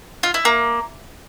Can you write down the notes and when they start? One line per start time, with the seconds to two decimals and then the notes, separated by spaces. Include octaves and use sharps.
0.23 F4
0.34 E4
0.45 A#3